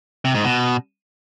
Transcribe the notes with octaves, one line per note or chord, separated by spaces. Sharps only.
C3
G#2
B2